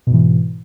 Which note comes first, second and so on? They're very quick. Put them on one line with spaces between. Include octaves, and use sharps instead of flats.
B2 G#2 E3